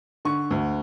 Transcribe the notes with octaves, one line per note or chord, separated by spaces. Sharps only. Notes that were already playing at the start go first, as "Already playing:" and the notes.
D3 C#6
D2